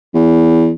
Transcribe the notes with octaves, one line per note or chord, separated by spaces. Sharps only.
E2